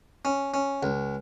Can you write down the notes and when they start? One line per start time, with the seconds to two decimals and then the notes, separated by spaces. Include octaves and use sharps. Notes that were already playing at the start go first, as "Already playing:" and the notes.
0.25 C#4
0.54 C#4
0.83 C#2